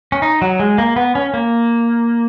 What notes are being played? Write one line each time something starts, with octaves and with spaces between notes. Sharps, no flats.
C#4
D#4
F#3
G#3
A#3
B3
C#4
A#3